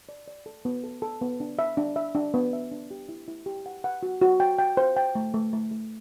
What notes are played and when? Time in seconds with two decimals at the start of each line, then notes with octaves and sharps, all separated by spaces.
0.09 D5
0.27 D5
0.46 A4
0.65 B3
0.84 A4
1.02 A4
1.21 B3
1.40 D4
1.59 E5
1.77 D4
1.96 E5
2.15 D4
2.34 B3
2.53 E5
2.72 D4
2.91 G4
3.09 E4
3.28 E4
3.46 G4
3.66 F#5
3.84 F#5
4.03 F#4
4.22 F#4
4.40 G5
4.58 G5
4.77 C5
4.96 G5
5.15 A3
5.34 A3
5.53 A3
5.71 A3